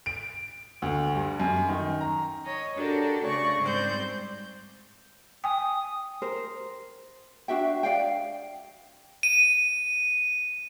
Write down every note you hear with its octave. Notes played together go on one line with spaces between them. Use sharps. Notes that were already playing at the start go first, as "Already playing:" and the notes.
D7
D2
G2
F#2
D#3
A#5
C#5 D#5
D4 F#4 G4 A4 A#4
C#3 A3 D5 C#6 A#6
G#2 G3 C4 C5 D5 G6
G5 G#5 D#6
A#4 C5
D4 F#4 E5 G5
D5 F5 G5
D#7